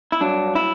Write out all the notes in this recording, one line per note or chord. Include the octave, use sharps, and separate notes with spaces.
E4
G2 F#3 D4
E4